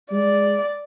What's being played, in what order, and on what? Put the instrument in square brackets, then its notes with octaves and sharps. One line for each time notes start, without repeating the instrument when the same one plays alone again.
[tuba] G#3 [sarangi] D5